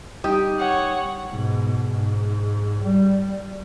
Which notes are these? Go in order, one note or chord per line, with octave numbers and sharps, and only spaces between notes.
G3 D#4 G4 D#6
C#5 F#5
G#2 B2
G#2
G3